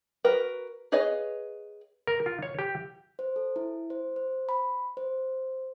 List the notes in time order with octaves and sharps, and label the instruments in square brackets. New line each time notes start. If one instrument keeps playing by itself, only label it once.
[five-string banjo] F#4 A#4 B4
G#4 B4 C#5 D#5 F5
[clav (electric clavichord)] A#4
F4
C#5
G4
[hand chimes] C5
A4
E4
C5
C5
B5
C5